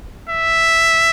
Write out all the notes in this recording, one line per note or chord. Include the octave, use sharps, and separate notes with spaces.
E5